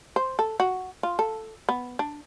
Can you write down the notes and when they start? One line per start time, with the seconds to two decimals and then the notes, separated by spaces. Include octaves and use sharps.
0.16 C5
0.39 A4
0.60 F#4
1.03 F4
1.19 A4
1.69 B3
1.99 D4